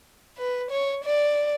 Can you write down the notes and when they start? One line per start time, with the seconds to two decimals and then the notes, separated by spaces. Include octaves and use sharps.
0.38 B4
0.71 C#5
1.04 D5